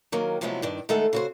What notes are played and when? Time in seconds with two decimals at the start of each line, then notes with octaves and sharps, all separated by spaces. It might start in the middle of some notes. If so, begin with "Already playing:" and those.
0.12 D#3 F#3 A#3
0.41 C3 F3 F#3 G#3 A3 B3
0.62 G2 D#3 D4
0.89 D#3 G#3 A3 A4 F#5
1.13 C#3 F#4 C5